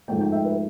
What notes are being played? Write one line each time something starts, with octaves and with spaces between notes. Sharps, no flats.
G#2 F3 A3 G5
G5
E5
B4